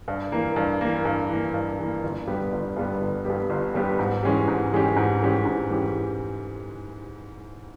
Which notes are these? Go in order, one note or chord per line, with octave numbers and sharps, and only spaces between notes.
G2
E3 A#3
G2
E3 A#3
G2
E3 A#3
G2
E3 A#3
G1
G2 G3 B3 G4
G1
G2 G3 B3 G4
G1
G2 G3 B3 G4
G1
G2 G3 B3 G4
G#2
E3 G#3 C#4 G4
G#2
E3 G#3 C#4 G4
G#2
E3 G#3 C#4 G4
G#2
E3 G#3 C#4 G4